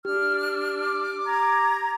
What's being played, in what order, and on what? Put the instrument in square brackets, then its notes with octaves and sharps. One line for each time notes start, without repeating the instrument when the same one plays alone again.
[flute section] D4 F6 [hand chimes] G4
[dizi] D6
[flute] A#5 [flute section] G#6